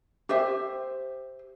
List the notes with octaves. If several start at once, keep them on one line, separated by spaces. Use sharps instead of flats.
G4 C5 E5